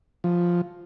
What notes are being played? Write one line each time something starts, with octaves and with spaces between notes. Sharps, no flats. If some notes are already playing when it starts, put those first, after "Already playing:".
F3